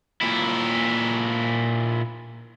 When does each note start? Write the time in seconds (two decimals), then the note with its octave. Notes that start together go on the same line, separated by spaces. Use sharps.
0.21 A#2 E4